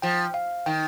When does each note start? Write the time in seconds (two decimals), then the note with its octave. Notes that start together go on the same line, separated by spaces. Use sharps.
0.02 F3 G5
0.34 F5
0.66 D#3 G5